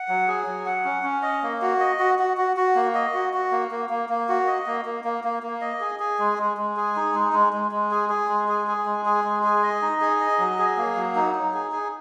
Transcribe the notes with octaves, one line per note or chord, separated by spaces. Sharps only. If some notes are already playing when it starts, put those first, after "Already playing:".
Already playing: F#5
F#3
G#4
F#3
F#5
C#4
C#4
D#5
A#3
F#4
D#5
F#4
F#4
F#4
F#4
A#3
D#5
F#4
F#4
A#3
A#3
A#3
A#3
F#4
D#5
A#3
A#3
A#3
A#3
A#3
D#5
G#4
G#4
G#3
G#3
G#3
G#4
D#4
G#3
G#3
G#3
G#3
G#4
G#4
G#3
G#4
G#4
G#3
G#4
G#3
G#4
D#5
D#4
G#4
D#5
F#3
G#4
A#3
F#3
D#4
D#4
G#4
G#4